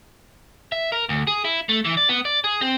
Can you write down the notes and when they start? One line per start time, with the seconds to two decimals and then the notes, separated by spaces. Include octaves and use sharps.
0.72 E5
0.92 A#4
1.09 D2
1.27 G#4
1.45 E4
1.69 A3
1.85 E3
1.97 D5
2.09 B3
2.25 D5
2.44 G#4
2.61 C4